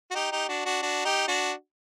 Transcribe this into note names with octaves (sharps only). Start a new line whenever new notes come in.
F#4
D#4 G4
D#4 G4
D4 F#4
D4 F#4
D4 F#4
D#4 G4
D4 F#4